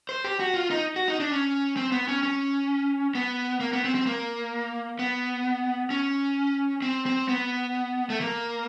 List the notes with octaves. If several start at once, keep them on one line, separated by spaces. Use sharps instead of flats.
C5
G4
F#4
F4
D#4
F#4
D#4
D4
C#4
C4
B3
C#4
C#4
B3
A#3
B3
C4
C4
A#3
B3
C#4
C4
C4
B3
A3
A#3